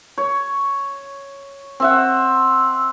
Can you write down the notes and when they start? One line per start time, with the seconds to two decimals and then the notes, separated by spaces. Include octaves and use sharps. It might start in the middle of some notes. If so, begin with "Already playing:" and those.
0.18 C#5
1.80 C4 E5 F#5